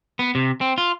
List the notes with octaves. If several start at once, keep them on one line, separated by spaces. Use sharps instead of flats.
B3
C3
C4
F4